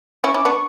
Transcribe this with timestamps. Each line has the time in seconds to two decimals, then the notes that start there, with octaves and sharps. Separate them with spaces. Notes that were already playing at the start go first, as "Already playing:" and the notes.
0.23 C#4 E4 C#6
0.34 C#4 E4 D6
0.45 B3 D4 C#6